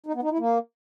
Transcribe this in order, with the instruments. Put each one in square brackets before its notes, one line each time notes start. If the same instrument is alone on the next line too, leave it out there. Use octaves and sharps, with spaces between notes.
[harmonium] D#4
B3
D#4
E4
A#3